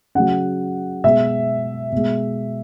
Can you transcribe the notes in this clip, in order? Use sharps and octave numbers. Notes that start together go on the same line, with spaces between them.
C#3 F#3 F#5
B2 G#3 E5
B2 G#3